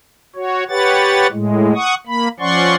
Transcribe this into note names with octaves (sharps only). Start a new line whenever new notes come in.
F#4 C#5
G4 B4 C#5 F#5 A6
A2 G#3
F#5 C#6 D#6
A#3 B5
F3 C#4 D5 F#5 C6 C#6